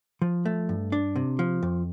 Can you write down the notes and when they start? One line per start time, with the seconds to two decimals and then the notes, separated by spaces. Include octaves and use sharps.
0.22 F3
0.45 A3
0.69 G2
0.92 D4
1.16 C3
1.39 F3
1.63 F2